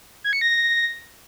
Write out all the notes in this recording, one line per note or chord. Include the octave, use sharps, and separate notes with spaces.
G#6
C#7
A#6